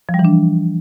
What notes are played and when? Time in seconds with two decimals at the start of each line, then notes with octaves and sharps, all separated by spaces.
0.09 F3
0.14 G3
0.19 E3
0.25 D4